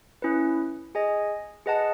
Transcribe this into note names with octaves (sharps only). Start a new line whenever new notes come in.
C#4 E4 B4
G#4 D#5 G#5
G#4 B4 D#5 F#5 A5